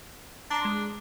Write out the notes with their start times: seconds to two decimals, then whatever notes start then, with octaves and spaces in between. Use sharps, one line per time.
0.50 D4 A5 A#5 C6
0.65 G#3